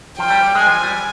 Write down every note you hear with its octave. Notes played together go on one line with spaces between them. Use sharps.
F3 G5
G3
G3
G#3
F3 G#5
G3